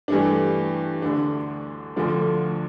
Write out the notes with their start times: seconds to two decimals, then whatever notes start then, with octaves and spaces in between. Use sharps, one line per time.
0.08 G2 E3 A3 D4
1.02 D2 D3 A3 D4
1.96 D2 D3 F3 A3 D4